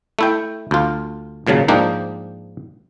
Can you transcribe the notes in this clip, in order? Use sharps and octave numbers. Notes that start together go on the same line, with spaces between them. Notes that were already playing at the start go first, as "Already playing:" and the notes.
A3 E4 G5
D2 F4
G#1 A#2 C#3 F#3 A5
G#2 F3 A#3 D4 D#4 G5